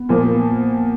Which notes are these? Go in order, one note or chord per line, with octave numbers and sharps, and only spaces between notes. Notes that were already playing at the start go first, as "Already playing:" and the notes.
Already playing: B3
A#2 F3 A#3